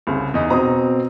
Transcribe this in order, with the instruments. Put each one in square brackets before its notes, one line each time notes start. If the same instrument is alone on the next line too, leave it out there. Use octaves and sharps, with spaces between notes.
[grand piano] C2 C#3
E2 D#4
[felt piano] B2 C4 [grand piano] A#5 C6 D#6